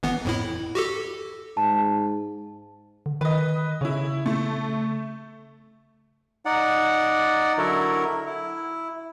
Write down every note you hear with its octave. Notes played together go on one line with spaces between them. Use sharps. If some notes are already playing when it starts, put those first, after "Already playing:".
G1 E3 B3
F2 A2 E4
F#4 G4 A4
G#2 A5
D3
D#3 B4 D#5
C#3 C#4 E4
A3
D#4 D5 F#5
D3 F#3 E4 A#4 C#5
E4